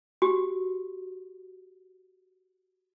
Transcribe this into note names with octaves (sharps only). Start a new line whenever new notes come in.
F#4 G4